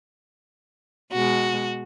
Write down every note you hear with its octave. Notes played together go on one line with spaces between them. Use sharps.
B2 G#3 F#4